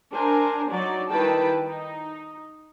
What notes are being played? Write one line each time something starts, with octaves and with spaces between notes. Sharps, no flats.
D4 A#4 C5 G#5
F#3 D#4 D5
D#3 G3 E4 B4 G5 A5
D#4